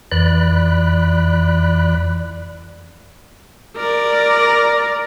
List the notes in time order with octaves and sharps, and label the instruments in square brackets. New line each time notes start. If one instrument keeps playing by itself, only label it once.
[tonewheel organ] F2 E3 D5 B5 F#6
[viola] A#4 D5